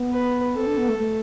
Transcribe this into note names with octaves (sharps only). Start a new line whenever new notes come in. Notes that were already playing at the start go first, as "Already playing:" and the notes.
Already playing: B3
B4
C4 A4
D4
B3
A3
A3